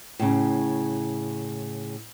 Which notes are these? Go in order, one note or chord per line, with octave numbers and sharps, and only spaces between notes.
A2 C#3